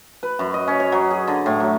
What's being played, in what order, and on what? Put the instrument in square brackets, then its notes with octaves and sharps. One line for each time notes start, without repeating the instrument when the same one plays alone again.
[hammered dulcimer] B4
F#2
D#5
C#4
C#5
F#3
G#4
D3
A2
F#3